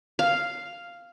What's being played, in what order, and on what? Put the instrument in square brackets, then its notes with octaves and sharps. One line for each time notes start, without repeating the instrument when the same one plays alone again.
[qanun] F5